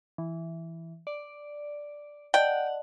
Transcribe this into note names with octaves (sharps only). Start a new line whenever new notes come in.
E3
D5
D5 D#5 F#5 G5 A5